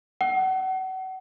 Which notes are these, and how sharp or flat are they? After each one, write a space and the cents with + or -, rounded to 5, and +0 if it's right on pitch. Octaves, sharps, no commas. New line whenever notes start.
F#5 +30